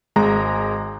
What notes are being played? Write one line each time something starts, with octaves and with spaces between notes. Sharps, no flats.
G#1 G#3 A#5